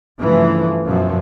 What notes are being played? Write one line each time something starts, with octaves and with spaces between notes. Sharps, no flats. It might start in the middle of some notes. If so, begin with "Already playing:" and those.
G2 C#3 E3 F3 A3
F#2 B2 F3